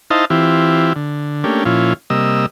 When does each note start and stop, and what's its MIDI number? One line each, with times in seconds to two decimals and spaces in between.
0.10 0.25 63
0.10 0.25 64
0.10 0.25 72
0.10 0.25 75
0.10 0.25 77
0.10 0.25 81
0.30 0.93 52
0.30 0.93 60
0.30 0.93 64
0.30 0.93 65
0.30 0.93 67
0.96 1.44 50
1.44 1.64 57
1.44 1.64 58
1.44 1.64 61
1.44 1.64 62
1.44 1.64 67
1.66 1.93 46
1.66 1.93 53
1.66 1.93 61
1.66 1.93 64
1.66 1.93 65
2.10 2.46 48
2.10 2.46 55
2.10 2.46 58
2.10 2.46 75
2.10 2.46 88